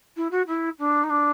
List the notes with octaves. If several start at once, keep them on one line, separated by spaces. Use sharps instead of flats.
E4
F#4
E4
D4
D#4
D4